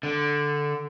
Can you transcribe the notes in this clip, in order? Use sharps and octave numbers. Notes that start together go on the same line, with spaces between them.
D3